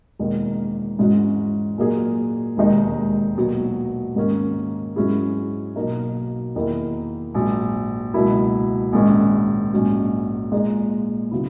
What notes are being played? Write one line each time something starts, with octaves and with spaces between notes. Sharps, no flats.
E1 E2 D#3 A#3
G#2 E3 G#3 C#4 F#4
A#2 F#3 A#3 D#4 G#4
E1 D#2 D#3 G#3 D#4
B1 A#2 F#3 B3
G#2 D#3 A#3 C#4
G#2 F#3 C#4 E4 G#4
B1 B2 A#3 D#4
E2 D#3 A#3 E4
A#1 G#2 F#3
C#2 B2 F#3 A#3 E4
A#1 G#2 D#3 G#3 C#4
A#1 G#2 F#3 C#4
A#2 G#3 D#4 G#4
C#3 F#3 B3 E4